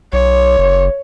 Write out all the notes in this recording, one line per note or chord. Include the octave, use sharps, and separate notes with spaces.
B1 C#5
F#1